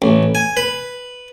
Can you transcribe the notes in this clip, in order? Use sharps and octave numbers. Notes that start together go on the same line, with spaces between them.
A1
G#5
B4